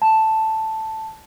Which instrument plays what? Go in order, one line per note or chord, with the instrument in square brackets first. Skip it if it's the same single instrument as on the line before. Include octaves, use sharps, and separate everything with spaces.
[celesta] A5